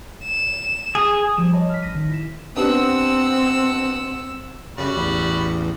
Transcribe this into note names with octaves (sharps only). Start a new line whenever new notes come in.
E7
G#4
F3 G3 D6 E7
C#5 D#5 A5 B5
F6 B6
A1 A#6 D#7
D#3
E4 B6 E7
B3 C4 D4 G4 F#5 E6
F#2 C#3 G3 F#4 B5
A1 E2